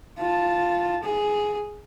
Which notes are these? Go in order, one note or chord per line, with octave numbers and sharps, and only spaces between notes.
F4 A5
G#4